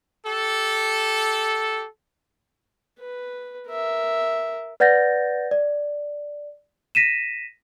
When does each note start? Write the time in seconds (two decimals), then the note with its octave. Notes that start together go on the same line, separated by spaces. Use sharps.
0.26 G4 A4
3.00 B4
3.69 A#4 E5
4.80 B4 D5 F#5 G6 A6 A#6
5.51 D5
6.95 A#6 B6 D#7 E7